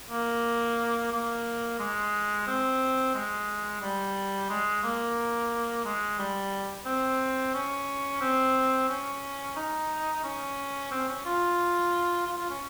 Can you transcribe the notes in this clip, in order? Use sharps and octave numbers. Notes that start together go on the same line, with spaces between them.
A#3
A#3
G#3
C4
G#3
G3
G#3
A#3
G#3
G3
C4
C#4
C4
C#4
D#4
C#4
C4
C#4
F4
F4
F4
C#4